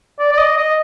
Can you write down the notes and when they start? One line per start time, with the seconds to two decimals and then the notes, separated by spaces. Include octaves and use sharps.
0.19 D5
0.32 D5
0.38 D#5
0.58 D#5